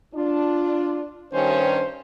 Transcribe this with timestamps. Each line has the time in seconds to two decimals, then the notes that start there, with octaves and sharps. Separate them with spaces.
0.14 D4 F4
1.33 G2 D#3 C#4 C5